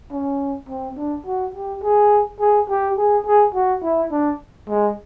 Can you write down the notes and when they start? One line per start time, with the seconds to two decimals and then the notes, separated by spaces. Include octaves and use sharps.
0.12 C#4
0.69 C4
0.97 D4
1.26 F#4
1.54 G4
1.83 G#4
2.40 G#4
2.69 G4
2.98 G#4
3.26 G#4
3.55 F#4
3.83 E4
4.12 D4
4.69 G#3